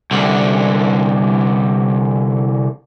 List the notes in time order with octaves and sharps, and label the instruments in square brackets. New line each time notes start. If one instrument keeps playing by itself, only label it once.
[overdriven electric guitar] C2 D3